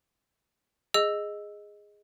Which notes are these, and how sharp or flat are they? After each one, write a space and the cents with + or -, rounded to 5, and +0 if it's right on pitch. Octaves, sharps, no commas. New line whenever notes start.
G#4 -5 D#5 +0 E6 +0